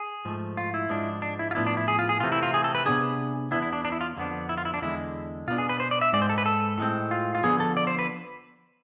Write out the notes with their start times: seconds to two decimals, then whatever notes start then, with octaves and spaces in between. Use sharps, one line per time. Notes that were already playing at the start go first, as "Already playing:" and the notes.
Already playing: G#4
0.25 G#2 F3 A3
0.57 F4
0.74 E4
0.89 G#2 F3 G#3 D4
1.22 D4
1.39 E4
1.51 F4
1.55 A2 F3 B3 D4 E4
1.67 D4
1.77 E4
1.88 G#4
1.99 F4
2.09 G#4
2.20 C3 E3 A3 C4 F4
2.32 E4
2.43 F4
2.54 G#4
2.64 A4
2.75 B4
2.85 C3 F3 B3 D4 G#4
3.51 E2 B2 B3 D4 E4
3.62 E4
3.73 D4
3.85 D4
3.92 E4
4.01 F4
4.17 F2 D3 F3 B3 D4
4.49 E4
4.58 F4
4.65 E4
4.74 D4
4.82 E2 D3 G#3 E4
5.48 B2 F4
5.50 B3 D4
5.58 G#4
5.69 B4
5.80 C5
5.91 D5
6.01 E5
6.13 G#2 G#3 C4 D5
6.22 C5
6.29 A4
6.38 B4
6.46 A4
6.78 A2 G#3 C4
7.11 F4
7.35 F4
7.44 D3 F3 B3 G#4
7.60 A4
7.77 D5
7.87 C5
7.99 B4